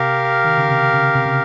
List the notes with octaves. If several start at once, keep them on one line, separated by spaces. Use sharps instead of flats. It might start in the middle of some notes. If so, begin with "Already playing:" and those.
Already playing: C3 G4 A#4 F5
D#3
C#3
C3
C#3
C3
C#3